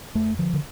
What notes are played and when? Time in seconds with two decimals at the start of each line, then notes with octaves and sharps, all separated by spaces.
0.15 F2 A3
0.39 D3 F3
0.53 D3